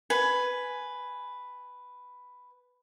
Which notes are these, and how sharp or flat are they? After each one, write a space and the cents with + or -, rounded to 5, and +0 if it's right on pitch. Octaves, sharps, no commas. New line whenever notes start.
B4 +5 G#5 +10